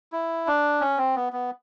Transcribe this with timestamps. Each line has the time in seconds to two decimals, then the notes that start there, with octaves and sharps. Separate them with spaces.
0.12 E4
0.47 D4
0.80 C#4
0.98 C4
1.16 B3
1.33 B3